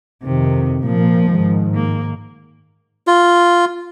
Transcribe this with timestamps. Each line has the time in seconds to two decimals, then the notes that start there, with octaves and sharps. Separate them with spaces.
0.24 F2 C3 D#3
0.85 A#2 F3 A#3
1.31 G#2 D#3
1.75 A#3
3.07 F4